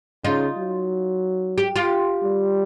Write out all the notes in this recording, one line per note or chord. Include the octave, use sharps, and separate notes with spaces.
C#3 D#4 F4
F#3
G4
F4 G4
G3